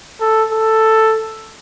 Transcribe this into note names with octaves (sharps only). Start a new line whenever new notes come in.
A4
A4